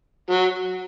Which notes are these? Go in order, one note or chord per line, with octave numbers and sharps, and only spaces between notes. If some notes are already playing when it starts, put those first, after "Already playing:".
F#3